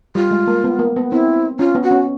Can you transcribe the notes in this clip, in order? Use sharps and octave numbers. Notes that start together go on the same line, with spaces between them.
G3 F4
G#3
A#3
B3
A#3
B3
C4 E4
C#4 F4
B3
F#4
C#4